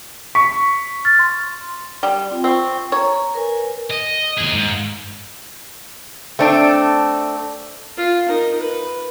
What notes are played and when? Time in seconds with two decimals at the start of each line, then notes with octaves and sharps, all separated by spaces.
0.35 C#6 B6
1.05 F6 A6
1.19 C6
2.03 G3
2.31 C4 F4
2.44 C4 C#6
2.92 C#5 A#5
3.35 A#4 B4 G#5
3.90 D#5
4.38 D#2 G#4
4.54 G#2
6.39 A3 C4 D4
7.97 F4
8.26 D#4 A#4
8.60 B4